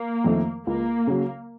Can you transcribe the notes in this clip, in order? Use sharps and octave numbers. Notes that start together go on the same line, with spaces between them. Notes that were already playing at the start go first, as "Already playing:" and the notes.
Already playing: A#3
F2 D#3 A3
C#2 A#3
C#3 F#3